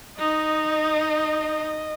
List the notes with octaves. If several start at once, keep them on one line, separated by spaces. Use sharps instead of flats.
D#4 D#5